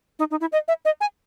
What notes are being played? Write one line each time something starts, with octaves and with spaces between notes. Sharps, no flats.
D#4
D#4
E4
D#5
E5
D#5
G#5